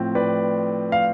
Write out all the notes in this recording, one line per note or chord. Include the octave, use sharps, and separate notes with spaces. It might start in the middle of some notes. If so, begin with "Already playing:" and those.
Already playing: A2 F3 C4
B4 D5
F5